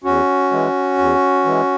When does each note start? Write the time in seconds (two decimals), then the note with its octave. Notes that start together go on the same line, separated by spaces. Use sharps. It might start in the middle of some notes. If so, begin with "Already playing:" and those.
0.04 E2 C#4 F#4
0.51 E3 G#3
0.98 E2
1.45 E3 G#3